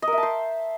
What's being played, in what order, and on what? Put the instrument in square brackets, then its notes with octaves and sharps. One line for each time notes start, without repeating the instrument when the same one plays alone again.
[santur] D#5
A#4
E5
A5
C5